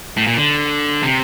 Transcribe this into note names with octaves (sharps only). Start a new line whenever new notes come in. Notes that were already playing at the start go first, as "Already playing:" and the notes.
A2
A#2
D3
C3